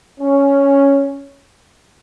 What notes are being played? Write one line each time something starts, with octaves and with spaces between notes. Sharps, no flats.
C#4